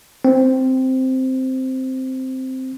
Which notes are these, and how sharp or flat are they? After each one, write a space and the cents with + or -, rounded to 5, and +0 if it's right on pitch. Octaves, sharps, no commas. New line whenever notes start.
C4 -5